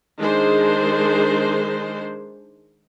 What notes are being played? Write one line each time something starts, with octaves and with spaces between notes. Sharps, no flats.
D#3 G#3 D4 G#4 C5